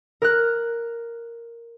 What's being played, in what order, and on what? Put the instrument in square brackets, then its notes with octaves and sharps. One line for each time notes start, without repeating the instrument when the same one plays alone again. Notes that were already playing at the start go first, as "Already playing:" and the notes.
[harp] A#4 F6 F#6